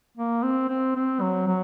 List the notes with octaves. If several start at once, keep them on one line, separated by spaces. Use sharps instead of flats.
A#3
C4
C4
C4
F#3
F#3